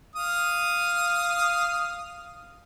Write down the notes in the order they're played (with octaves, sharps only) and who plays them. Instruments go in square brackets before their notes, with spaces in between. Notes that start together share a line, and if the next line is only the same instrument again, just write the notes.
[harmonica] F5 D#6